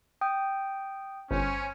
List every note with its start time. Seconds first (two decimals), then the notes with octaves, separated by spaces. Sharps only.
0.21 G5 D#6
1.31 G1 C#4 C5